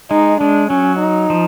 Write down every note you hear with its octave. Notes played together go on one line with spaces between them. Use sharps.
G#3 D#4
G#3 D4
F#3 C#4
D#4
F3